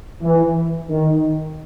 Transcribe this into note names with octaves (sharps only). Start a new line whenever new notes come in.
E3
D#3